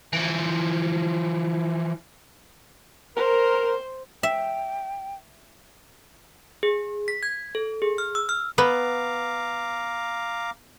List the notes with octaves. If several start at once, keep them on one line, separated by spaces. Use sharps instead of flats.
E3 F3
A#4 C5
E5 G5
G#4
B6
G#6
A4
G#4
F6
E6
F6
B3 F5 A#5 D6